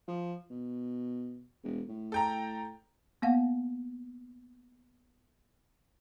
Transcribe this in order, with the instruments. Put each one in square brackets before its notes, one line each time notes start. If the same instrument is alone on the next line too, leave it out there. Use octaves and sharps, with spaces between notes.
[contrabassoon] F3
B2
E1
A2
[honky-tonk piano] A4 G5 A#5
[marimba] A#3 B3 F5 F#5